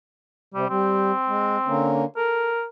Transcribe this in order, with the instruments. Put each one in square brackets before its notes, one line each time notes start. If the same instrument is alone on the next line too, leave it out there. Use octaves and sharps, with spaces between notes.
[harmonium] C3 [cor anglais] G3
[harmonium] G3 [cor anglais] C4
[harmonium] G#3
D3 A#3 C#4
[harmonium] A4 [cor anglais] A#4